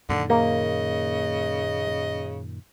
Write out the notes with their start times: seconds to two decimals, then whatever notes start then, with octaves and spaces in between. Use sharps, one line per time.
0.09 F#2 A#2 D3 D#3
0.30 C#3 A#3 D#5